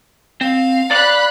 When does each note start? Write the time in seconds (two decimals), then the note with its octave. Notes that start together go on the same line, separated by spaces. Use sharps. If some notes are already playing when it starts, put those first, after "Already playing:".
0.41 C4 F5
0.91 D5 B5 F#6